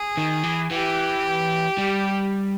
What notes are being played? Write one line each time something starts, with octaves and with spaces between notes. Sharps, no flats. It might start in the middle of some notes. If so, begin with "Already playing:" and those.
Already playing: G#4
D#3
E3
E3 G4
G3